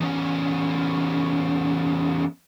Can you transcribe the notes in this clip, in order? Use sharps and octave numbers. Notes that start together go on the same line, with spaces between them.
E2 C#4